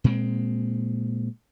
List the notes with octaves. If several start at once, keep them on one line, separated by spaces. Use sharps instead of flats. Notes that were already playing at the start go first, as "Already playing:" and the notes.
A#2 G#3 C4